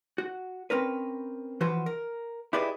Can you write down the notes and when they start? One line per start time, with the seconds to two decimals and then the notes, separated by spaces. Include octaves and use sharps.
0.18 F#4
0.70 C4 C#4 A#4 B4
1.61 E3 F3 F#4 B4 C5
1.86 A#4
2.53 E4 G4 G#4 B4 D5 D#5